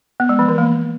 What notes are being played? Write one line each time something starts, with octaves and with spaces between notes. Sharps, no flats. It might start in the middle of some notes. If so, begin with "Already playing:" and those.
B3
G#3
F3
E3
A#3